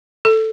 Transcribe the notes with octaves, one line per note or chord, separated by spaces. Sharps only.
A4